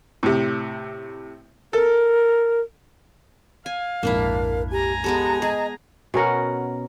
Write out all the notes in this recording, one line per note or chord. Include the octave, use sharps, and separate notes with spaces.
A2 C3
A4 A#4
F5 G#5
A#1 F2 G#2 A#3 D4 E4 A#4
G4 G#5 A#5
G#3 B3 G4 A4
G#4 D#5
B2 C#4 A#4 F#5